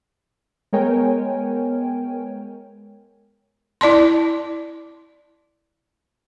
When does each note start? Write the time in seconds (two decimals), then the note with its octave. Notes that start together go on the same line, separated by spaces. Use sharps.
0.73 G#3 B3 A#4 C#5 G5 G#5
3.81 E4 D5 A5 C6